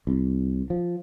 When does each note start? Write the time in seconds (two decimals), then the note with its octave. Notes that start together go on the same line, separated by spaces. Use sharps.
0.07 C2
0.70 F3